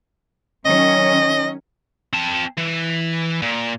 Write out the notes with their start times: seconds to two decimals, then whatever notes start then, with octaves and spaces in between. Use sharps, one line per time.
0.65 D#3 F#3 C#4 D#5
2.13 C4 A5
2.57 E3
3.42 A#2